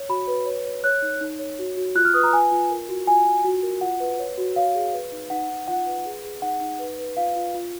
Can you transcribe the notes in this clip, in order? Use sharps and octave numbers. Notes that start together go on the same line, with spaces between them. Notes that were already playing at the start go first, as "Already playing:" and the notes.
Already playing: C#5
F#4 B5
B4
C#5
C#5
C#5 F#6
D#4
D#4
C#5
F#4
F#4
F4 F#6
F6
B4 D#6
A#5
F4 G#5
F4
A#4
F#4
F4 G#5
F4
F#4
A#4
F4 F#5
B4
C#5
F#4
C#5 F5
G#4
B4
D#4
D#4 F#5
D#4
F4 F#5
B4
G#4
G#4
D#4 F#5
D#4
B4
B4
F4 F5
F4
F4